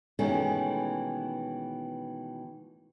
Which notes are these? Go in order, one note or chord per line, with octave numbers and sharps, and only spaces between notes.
B2 D#3 E3 G#3 A3 C#4